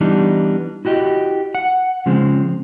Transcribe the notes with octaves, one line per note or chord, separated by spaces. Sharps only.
E3 G3 B3 D4 D#4
E4 F#4 G4 D#5
F#5
C#3 F3 G#3 C4